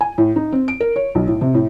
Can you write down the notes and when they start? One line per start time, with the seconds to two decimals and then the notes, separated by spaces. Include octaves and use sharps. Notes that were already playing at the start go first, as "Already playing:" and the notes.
0.01 G#5
0.18 A2
0.36 D#4
0.52 C4
0.68 D7
0.80 A#4
0.96 C#5
1.15 B1
1.27 A2
1.41 C3
1.54 A2